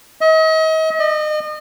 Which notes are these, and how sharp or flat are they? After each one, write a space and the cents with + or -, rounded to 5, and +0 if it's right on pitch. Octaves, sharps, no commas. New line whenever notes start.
D#5 +40
D#5 -35